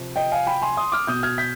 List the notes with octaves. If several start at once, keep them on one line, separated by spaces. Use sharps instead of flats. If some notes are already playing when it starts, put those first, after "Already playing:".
Already playing: C3 F3
D#5 G5
F5 G#5
G5 B5
G#5 C6
C6 D#6
D6 F6
B2 D#6 G6
F6 G#6
G6 B6